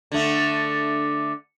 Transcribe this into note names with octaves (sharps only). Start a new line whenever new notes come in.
D3 A3